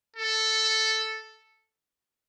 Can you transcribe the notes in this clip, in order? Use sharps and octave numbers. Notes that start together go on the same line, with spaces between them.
A4